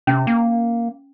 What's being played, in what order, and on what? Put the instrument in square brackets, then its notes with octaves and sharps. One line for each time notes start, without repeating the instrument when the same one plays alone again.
[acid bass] C3 [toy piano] C#4
[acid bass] A#3